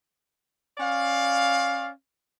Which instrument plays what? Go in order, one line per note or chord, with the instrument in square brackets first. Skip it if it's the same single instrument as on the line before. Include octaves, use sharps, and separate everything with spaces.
[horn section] C#4 D5 F5